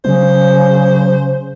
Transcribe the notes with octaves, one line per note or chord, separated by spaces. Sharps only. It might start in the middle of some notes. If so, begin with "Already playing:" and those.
C#3 F#3 C5